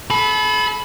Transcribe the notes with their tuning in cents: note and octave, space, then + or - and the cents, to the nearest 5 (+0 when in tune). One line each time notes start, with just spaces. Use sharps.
A4 -40 B5 +5